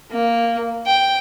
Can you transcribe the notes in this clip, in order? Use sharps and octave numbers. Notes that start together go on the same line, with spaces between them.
A#3
G5